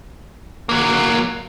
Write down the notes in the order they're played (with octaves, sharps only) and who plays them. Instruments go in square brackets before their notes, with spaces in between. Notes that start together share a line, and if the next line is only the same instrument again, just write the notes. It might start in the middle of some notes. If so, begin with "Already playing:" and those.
[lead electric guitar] F#3 A#3